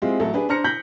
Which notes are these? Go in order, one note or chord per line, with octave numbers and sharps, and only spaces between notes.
G#3 C4 E4 F4 G4
A1 F#3 E4 A4
D4 G4 G#4 B4
D4 C5 A#5 F6 A#6 C#7
G6 A#6 B6 F#7